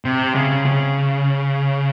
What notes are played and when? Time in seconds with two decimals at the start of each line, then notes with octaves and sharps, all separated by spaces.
0.05 C3
0.35 C#3
0.65 C#3